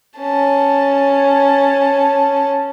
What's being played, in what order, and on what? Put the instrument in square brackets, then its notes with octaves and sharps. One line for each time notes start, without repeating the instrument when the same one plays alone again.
[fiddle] C#4 A5